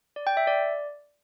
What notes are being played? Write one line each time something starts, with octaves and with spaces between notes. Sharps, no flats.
D5
G5
E5
D5